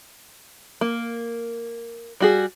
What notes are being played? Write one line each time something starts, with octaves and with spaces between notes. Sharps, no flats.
A#3
G3 F#4 G#4